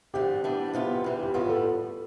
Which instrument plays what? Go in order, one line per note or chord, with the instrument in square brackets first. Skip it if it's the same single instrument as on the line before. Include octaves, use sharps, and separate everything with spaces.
[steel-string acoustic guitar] D2 D3 F3 A3 [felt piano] G4
[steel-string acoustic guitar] E3 G3 B3 D4
E2 C3 E3 B3 F4
E2 C3 E3 G3
[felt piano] G4
[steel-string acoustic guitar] A2 G3 B3 [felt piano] F4
[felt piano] A4